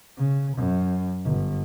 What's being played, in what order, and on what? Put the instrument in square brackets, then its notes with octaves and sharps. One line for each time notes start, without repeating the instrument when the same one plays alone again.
[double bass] C#3
F#2
G1